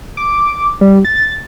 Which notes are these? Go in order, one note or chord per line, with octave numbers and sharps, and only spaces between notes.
D6
G3
A6